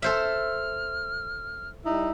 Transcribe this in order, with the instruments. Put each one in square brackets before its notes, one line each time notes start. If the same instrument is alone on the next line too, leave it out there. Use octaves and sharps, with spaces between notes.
[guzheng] A4 C5 E5 [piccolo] F6
[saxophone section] G3 D#4 E4